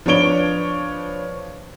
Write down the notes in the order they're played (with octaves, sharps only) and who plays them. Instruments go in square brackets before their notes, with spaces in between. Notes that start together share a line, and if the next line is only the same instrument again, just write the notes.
[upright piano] F3 D4 B4 C#5 D7 G7